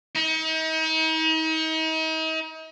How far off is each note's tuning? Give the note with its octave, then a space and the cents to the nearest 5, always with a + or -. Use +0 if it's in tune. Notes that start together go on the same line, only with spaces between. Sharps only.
D#4 +40